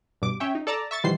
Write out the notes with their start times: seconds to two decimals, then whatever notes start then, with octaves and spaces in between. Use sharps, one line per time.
0.22 G2 B2 D6
0.40 C#4 C#5 E5 G5
0.55 D#4
0.67 A4 D5 A5 A#5
0.91 E5 C#6 A6
1.04 B2 D#3 E3 G3 C5 C7